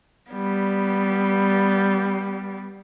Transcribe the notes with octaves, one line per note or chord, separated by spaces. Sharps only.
G3 B3